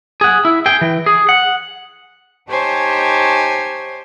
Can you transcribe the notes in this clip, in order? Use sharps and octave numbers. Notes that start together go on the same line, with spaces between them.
G#4 F#5
E4
G#4 G5
E3
G#4
F#5
D#4 G4 C5 C#5 G#5 A5